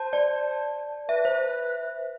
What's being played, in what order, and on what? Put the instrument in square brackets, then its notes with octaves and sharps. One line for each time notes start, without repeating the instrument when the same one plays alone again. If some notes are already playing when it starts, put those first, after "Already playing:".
Already playing: [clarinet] C5 [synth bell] A5
[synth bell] D5
[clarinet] B4 [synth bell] E5
[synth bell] C5